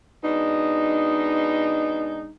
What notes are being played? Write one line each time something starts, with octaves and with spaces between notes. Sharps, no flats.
B2 G#3 D4 D#4